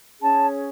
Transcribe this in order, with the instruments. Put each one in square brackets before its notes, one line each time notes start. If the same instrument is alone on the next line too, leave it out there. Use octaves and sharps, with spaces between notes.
[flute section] C#4 G#4 C#5 A5